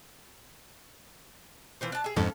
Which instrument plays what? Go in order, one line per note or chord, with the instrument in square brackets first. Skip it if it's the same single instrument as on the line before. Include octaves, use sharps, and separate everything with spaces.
[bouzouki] E3 F4 C5
D4 A5
G#4 E5
[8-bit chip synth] F2 G#2 [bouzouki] C#4 A4 F5